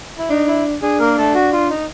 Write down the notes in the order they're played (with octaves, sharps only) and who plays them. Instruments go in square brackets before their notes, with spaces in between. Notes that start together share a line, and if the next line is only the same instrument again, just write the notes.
[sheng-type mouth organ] E4
[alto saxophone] D4 [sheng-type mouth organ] D#4
[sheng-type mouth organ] E4
[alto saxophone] D4 [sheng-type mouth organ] G#4
[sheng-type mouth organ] A#3 A#4
A3 A4
F#4
F4
D#4